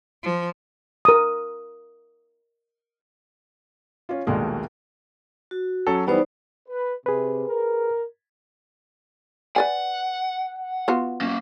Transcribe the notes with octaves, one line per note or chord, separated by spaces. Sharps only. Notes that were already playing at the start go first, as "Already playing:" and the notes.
F3
A#4 D#6
C#4 F4
A#1 D#2 B2 G#3 A3
F#4
F#3 C#4 A4
E3 G3 B3 D#4 C5 D5
B4
C3 G#4 B4
A#4
B4 D5 F#5 G#5
B3 F4 F#4
A#3 C#4